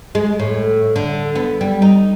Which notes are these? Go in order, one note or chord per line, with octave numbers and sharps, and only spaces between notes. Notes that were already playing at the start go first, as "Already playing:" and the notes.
G#3
A2
D3
B3
G3
D#4